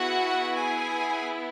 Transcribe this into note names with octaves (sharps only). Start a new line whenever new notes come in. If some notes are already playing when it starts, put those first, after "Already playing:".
Already playing: B3 E4 F#4 G#4 F#5
G#4 G#5